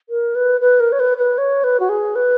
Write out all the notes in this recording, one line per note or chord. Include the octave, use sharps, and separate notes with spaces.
A#4
B4
B4
A#4
C#5
B4
B4
C#5
B4
F#4
G#4
B4